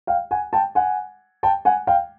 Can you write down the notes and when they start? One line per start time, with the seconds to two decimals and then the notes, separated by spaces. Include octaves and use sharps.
0.07 F5 G5
0.31 F#5 G#5
0.53 G5 A5
0.75 F#5 G#5
1.43 G5 A5
1.65 F#5 G#5
1.87 F5 G5